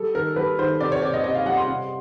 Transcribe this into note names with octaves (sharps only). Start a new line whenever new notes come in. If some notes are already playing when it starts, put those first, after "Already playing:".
Already playing: G3 A4
D#3 A#4
G3 B4
D#3 C5
C3 D5
C#5
C3 D5
D#5
C3 D#5
F5
G3 F#5
C6
C3